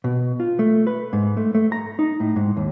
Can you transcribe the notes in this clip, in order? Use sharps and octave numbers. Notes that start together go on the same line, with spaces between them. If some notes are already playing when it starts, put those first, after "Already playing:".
B2
F4
A3
B4
G#2
A3
A3
A#5
D#4
A2
G#2
D#2